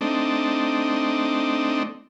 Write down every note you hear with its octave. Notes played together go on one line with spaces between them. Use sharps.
A3 C4 D4 D#4